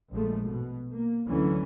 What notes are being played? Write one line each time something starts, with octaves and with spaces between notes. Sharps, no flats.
A#1 F3 G#3 A3
B2
A#3
D2 D3 E3 F#3 C#4